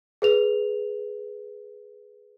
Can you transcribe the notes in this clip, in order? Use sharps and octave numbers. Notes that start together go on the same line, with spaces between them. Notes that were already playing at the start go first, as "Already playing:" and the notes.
G#4 B4 F7